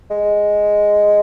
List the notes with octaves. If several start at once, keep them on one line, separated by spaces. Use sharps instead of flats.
G#3